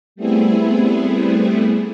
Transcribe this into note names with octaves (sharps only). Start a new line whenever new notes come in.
G3 A3 B3 C4 E4 G#4